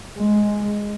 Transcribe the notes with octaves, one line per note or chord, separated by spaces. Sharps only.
G#3